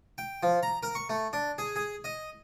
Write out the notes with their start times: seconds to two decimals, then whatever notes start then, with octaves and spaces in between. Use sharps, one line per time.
0.18 G5
0.43 F3
0.63 A#5
0.83 A#4
0.95 C#6
1.09 A3
1.33 D4
1.58 G#4
1.76 G#4
2.04 D#5